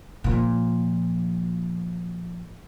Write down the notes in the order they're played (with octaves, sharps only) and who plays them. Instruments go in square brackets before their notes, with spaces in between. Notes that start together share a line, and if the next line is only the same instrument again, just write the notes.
[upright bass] A#2 F3